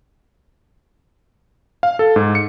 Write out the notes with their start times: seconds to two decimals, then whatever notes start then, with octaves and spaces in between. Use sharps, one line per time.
1.83 F5
1.99 A4
2.16 G#2
2.35 C#7